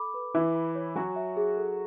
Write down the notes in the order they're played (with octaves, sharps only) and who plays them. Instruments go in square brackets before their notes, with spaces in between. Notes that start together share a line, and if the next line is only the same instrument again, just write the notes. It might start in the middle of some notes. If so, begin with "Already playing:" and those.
Already playing: [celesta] A4 B5 D6
B4
[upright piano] E3 E4 [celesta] D6
[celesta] B5
C#5
[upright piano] F#3 F#4 [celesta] G#5
[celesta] E5
G#4
A4